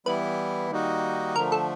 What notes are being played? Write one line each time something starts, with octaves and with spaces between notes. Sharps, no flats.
E3 G3 B3 E4 B4
D#3 G3 A#3 D#4 F#4
D3 F3 A3 A#4
A4